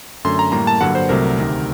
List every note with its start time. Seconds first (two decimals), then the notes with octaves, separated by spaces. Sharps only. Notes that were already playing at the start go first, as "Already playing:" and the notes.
0.25 F#2 D3 A3 C6
0.39 A#5
0.52 A2 G3 A#3 A#5
0.67 A5
0.80 G2 D3 F#3 A#3 F#5
0.95 C5
1.09 C2 C3 F#3 A3 A#4
1.37 D2 C3 D#3